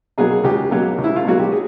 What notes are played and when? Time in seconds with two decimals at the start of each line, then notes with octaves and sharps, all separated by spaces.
0.18 B2 F#3 A#3 G#4
0.44 C#2 G4
0.71 B2 F#3 A#3
0.98 C#2
1.04 E4
1.16 F4
1.24 B2 F#3 A#3 F#4
1.39 G4
1.52 G#4